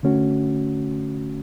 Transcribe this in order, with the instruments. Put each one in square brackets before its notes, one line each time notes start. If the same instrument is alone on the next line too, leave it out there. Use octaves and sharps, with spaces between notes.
[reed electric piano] D3 A3 C#4 F#4